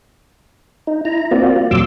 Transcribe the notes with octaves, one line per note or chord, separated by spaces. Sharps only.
D#4
E4 A#5
A#3 C4 F4 F#4 D5
F2 A#2 F#3 C6 D6 E6